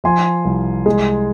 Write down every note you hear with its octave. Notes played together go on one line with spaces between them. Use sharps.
F3 G#5 C6
C2
G#3